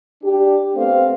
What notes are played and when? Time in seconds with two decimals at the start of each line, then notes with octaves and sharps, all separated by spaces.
0.23 D4 G4
0.75 A3 B3 C4 C5 F5